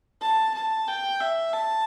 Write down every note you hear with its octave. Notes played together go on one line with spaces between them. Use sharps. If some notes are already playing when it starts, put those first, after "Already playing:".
A5
A5
G5
E5
A5